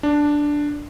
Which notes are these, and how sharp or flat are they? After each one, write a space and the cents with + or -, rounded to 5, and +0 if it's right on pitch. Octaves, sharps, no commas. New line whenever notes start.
D4 +0